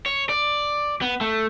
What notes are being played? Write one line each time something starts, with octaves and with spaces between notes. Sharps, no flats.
C#5
D5
B3
A3